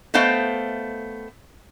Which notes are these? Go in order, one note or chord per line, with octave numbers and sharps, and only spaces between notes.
A3 B3 C5 D#5 F5 G5